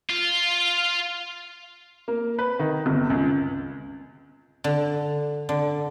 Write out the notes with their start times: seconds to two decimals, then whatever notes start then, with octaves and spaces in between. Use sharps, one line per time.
0.09 F4
2.08 A#3
2.39 B4
2.59 D#3
2.86 G1
3.10 C#2
4.64 D3
5.49 D3